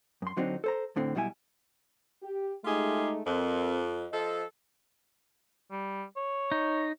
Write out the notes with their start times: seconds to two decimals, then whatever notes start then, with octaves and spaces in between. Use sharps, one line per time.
0.22 F#2 C6
0.37 D3 F#3 C4 D4 D#4
0.64 A4 C5 A#5
0.96 D2 A2 D3 C4
1.15 B1 B2 G3 E4 G#5
2.22 G4
2.64 G#3 A3 D#4 F4 G4 G#4
3.26 F2 C4 A#4
4.12 F3 A4 C5 D#5
5.71 G3
6.17 C#5
6.52 D#4